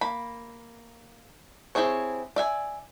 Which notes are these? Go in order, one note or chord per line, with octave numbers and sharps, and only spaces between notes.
A#3 B5
C4 E4 G4 G#4 C#5
D5 E5 G#5